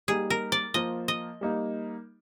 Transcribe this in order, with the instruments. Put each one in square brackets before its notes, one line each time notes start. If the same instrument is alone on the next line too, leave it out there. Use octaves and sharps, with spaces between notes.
[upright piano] G3 A#3 D#4 G4 [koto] G#4
[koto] A#4
D5
[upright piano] F3 A#3 F4 [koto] D#5
[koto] D#5
[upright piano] G3 A#3 D#4